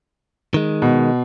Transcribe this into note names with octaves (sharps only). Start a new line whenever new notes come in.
D#3 G#3
B2